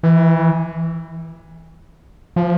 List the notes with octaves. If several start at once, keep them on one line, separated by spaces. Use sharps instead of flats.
E3
F3